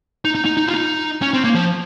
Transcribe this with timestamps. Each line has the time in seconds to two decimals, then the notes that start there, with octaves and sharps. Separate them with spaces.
0.25 D#4
0.35 D#4
0.45 D#4
0.57 D#4
0.67 F4
0.74 D#4
1.22 C#4
1.34 C4
1.44 A#3
1.55 F3